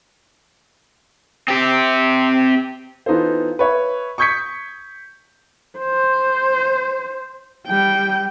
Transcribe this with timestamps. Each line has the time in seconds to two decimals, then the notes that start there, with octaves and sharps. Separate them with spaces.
1.48 C4 G4
3.06 E3 B3 D#4 F4 A4 C5
3.59 B4 C#5 E5
4.18 C#6 D#6 G6 G#6 B6 C#7
5.78 C5
7.68 G3 G5